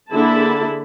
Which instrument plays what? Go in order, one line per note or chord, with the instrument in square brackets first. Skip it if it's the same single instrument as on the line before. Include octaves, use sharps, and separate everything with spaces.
[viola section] D3 A#3 E4 G#4 A5 B5